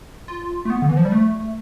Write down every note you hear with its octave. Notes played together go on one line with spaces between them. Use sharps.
F4
A3
B3
D3
E3
F3
G3
A3